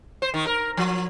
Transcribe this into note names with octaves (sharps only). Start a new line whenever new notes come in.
C5
D#3
A#4
F3